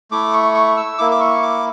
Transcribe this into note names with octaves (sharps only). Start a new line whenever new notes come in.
A3 E4 D6
C#6
C#6
E6
A#3 E4 D6
D6
C#6
D6